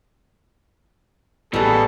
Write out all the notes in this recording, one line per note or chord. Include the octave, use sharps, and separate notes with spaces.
A1 B2 G3 G#4 A4